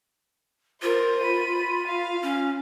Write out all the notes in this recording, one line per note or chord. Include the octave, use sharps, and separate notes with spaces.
F4 A#4 C5
B5 D#7
F5
C#4